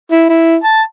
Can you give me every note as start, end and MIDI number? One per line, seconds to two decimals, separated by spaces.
0.11 0.27 64
0.29 0.56 64
0.64 0.81 81